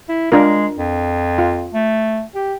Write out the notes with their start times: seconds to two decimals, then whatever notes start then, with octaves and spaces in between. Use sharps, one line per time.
0.09 E4
0.32 G#3 D4 F4 A#4
0.78 F2
1.38 F4
1.74 A3
2.35 G4